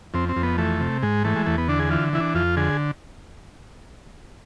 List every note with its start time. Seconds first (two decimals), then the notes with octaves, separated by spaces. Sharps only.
0.14 F2 C4
0.29 C4
0.36 F2
0.43 B3
0.58 E3 A3
0.80 C3
1.02 G#2 G#3
1.25 E3 A3
1.36 G#3
1.46 E2 A3
1.58 B3
1.68 D3 D4
1.79 G#4
1.91 E3 F4
2.13 E3 E4
2.20 D4
2.35 F2 F4
2.57 D3 G#4